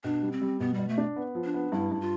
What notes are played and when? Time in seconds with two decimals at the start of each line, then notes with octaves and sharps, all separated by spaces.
0.04 B2 D4
0.23 G3
0.32 C4
0.41 G3
0.60 B2 B3
0.74 B2 G3
0.88 A3
0.98 D4
1.16 B3
1.35 F3
1.44 D4
1.54 B3
1.72 G2 E4
1.91 G2
2.01 F4